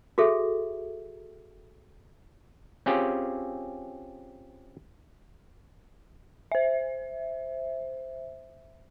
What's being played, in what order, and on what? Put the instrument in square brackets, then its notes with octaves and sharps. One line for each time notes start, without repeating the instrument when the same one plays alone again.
[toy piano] F#4 G#4 A4 E5
[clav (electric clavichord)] C4 C#4 F4 G4 G#4
[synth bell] C5 E5